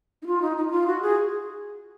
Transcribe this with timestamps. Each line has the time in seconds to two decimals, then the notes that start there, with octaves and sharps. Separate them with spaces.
0.22 D#4
0.26 F4
0.42 D#4
0.57 D#4
0.68 D#4
0.71 F4
0.87 F#4
1.02 G#4